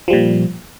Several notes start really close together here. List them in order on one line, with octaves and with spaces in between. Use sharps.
F3 G3 A#2